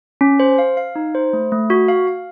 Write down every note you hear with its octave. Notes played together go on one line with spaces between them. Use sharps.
C#4
C5
F5
F5
D#4
C5
A3
A3
F#4
F5
F5